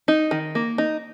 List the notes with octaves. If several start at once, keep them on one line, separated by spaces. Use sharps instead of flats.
D#4
D#3
A#3
D#4